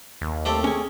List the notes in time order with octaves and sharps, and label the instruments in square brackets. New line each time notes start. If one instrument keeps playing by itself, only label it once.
[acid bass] D#2
[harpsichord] A3 C4 G4 [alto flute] A5
[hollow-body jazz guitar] C#4 G#5 [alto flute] G#4